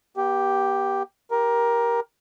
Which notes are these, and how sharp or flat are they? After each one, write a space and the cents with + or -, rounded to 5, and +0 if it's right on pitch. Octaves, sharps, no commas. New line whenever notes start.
B3 -45 G4 +0
G4 +0 A#4 +15